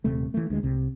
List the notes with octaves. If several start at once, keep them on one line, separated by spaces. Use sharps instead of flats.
D#1 C3 A3
E3 A3
D2 G#3
C2 C3